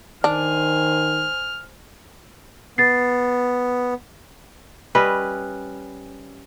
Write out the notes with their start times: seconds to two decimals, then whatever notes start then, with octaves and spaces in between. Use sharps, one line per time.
0.24 D#3 D4 C5 G#5 F6
2.78 B3 A6 C7
4.95 G3 C#4 B4 D#5